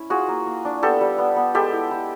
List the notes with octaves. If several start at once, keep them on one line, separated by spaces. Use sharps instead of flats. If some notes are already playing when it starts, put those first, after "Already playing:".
Already playing: C#4 E4
F4 F#4 G#4
A#3
A#3
D4
B3 G4 A4
G3
B3
B3
G#3 G4 A4
E4
E4